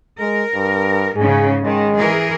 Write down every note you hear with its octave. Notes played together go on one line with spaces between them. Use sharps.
G#3 A#4
G2
G#2 C#3 G#4
D#3 G#3
E3 G#4 A#4